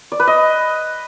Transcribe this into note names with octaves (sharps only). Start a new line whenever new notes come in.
D5
B4
D#5